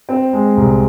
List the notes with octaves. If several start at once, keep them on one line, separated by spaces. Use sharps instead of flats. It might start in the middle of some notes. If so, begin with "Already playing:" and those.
C4
G#3
C2